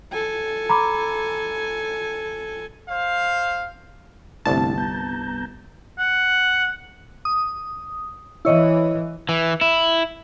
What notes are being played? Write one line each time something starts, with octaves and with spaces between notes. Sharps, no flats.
A4 G#5
A#5 B5 D6
C5 F5
G1 C2 A3 C4 E4 A5
B3 A#5 G6
F#5
D#6
E3 E4 C#5 D#5
E3
E4